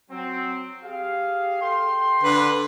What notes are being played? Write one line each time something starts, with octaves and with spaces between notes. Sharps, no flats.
F#3 C4
G4 G#4 F5
A4 G5 C6
D3 B4